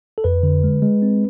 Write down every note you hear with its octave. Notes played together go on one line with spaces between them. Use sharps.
A4
F2 B4
D3
G#3
G#3
C4